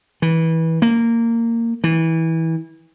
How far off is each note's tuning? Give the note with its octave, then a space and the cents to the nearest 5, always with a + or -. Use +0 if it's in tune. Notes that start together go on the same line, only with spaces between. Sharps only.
E3 -20
A#3 -15
E3 -20